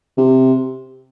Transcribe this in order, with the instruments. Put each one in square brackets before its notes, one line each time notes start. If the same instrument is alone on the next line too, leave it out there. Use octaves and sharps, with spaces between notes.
[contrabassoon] C3